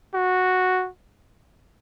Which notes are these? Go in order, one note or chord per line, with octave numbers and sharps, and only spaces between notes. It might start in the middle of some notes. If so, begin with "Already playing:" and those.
F#4